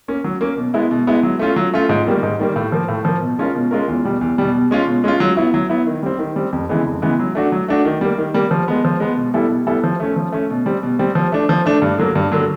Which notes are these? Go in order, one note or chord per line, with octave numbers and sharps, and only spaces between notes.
A#3 C#4
F#3
A#3 C#4
B2
G#3 B3 E4
B2
G#3 B3 E4
F#3
A3 C#4 F4
F#3
A3 C#4 F4
G#2
D#3 G3 A#3
G#2
D#3 G3 A#3
A2
F3 A#3
A2
F3 A#3
B2
G#3 C#4 F4 A#4
B2
G#3 C#4 F4 A#4
E2
B2 G3
E2
B2 G3
B2
G#3 C#4 F4
B2
G#3 C#4 F4
F#3
B3 E4
F#3
B3 E4
D#3
G3 C4
D#3
G3 C4
F2
C#3 E3 G#3 B3
F2
C#3 E3 G#3 B3
F#3
A3 D4 F#4
F#3
A3 D4 F#4
D#3
G3 A#3
D#3
G3 A#3
F3
G#3 B3
F3
G#3 B3
B2
G3 B3 E4 A4
B2
G3 B3 E4 A4
F3
A3 C#4
F3
A3 C#4
B2
G3 C4
B2
G3 C4
F3
A3 D4
F3
A3 D4
G2
D3 F#3 A#3
G2
D3 F#3 A#3